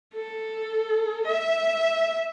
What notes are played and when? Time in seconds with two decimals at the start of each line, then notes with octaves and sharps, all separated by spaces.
0.15 A4
1.27 E5